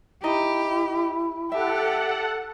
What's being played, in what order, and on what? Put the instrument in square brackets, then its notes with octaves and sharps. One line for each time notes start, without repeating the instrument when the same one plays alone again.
[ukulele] D#4 D#5 A#5 [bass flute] E4 [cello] G4
[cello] G4 [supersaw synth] A4 F#5 [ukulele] E5